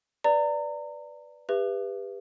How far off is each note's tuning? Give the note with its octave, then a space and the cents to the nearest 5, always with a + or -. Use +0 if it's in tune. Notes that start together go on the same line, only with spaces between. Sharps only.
B4 +0 D5 +0 A#5 -30
G4 +30 B4 +0 E5 +25